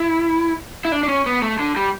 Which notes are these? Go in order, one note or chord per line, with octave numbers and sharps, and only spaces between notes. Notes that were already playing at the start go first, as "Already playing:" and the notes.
Already playing: E4
E4
D4
D4
C#4
B3
A3
D3
G3